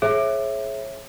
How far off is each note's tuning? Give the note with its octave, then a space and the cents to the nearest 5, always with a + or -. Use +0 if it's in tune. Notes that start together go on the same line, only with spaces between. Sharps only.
G#4 +30 C#5 -30 E5 +0